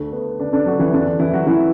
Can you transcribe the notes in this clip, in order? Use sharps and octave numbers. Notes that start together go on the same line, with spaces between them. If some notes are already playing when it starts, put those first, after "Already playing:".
Already playing: D2 D3 A3
B3
D3 D4
D3 D4
F#3 F#4
E3 E4
E2 D3 D4
E3 E4
F#3 F#4
E3 E4